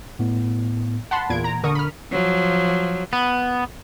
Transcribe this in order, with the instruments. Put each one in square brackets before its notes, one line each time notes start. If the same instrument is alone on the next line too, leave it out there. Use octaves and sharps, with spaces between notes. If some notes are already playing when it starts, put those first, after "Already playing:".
[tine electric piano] A2 B3
[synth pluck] F#5 A5 B5 C6
E2 A#2 G#6 D7
A#5
D3 A#4 C#6 D#6
B5 F6
[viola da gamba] F3 F#3
[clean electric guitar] B3